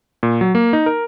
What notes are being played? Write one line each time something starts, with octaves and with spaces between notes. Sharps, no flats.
A#2
F#3
A#3
D#4
A#4